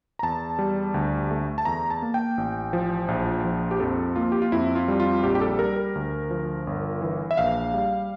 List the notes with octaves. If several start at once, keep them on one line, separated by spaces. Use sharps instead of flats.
A#5
E2 A5
G3
D2
A3
A5
E2 A#5
A5
A#3
G5
A1
F3
A#1
F3
G4
F2 A4
A#3 F4
G4
F4
F2 E4
F4
G3
F4
A#1 G4
G4
A4
G3 A#4
A#4
D2
F3
G1
E3
E5
A#1 F5
G3